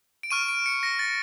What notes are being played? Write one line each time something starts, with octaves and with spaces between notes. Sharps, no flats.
D7
C#6 F6 D#7
D7
C#7
A#6
A6